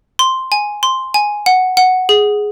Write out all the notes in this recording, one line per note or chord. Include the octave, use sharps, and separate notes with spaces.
C6
G#5
C6
G#5
F#5
F#5
G#4